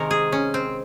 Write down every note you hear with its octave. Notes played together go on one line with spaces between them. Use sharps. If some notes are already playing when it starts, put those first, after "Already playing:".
Already playing: C3 D#3 G#3 A#4
G#4
C#4
C4